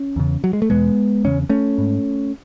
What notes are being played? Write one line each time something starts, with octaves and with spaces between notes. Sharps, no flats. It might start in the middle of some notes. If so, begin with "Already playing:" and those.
Already playing: C#4
E2 C#3
F#3
G#3
A3
E2 B2 G#3 B3
E2 C#3 C#4
A3 C#4
G#2